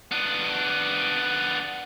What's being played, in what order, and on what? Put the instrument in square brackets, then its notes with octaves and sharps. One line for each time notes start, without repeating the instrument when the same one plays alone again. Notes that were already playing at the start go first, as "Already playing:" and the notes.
[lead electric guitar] B3 D4